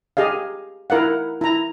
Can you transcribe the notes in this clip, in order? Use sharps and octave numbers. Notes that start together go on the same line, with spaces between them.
G4 G#4 D#5 F5
E4 A#4 F5 F#5
E4 A#5